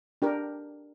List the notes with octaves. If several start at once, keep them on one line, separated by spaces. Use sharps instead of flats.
D4 G4 A#4